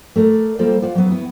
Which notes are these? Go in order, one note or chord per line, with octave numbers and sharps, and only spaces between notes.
A3 A#4 D5
G3 A#3 F4 A4 C5 D5
F4 C5 D5 F5 F#5
F#3 B3
B3 E4